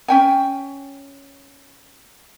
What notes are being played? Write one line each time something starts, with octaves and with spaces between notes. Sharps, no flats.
C#4 G5 G#5